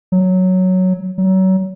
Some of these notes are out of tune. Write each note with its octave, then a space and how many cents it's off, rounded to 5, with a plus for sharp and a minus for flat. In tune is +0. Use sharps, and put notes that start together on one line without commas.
F#3 +0
F#3 +30